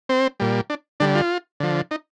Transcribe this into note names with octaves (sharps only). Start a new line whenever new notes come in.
C4
A#2 G3
D4
D3 G3 D4
F4
D3 F3
D#4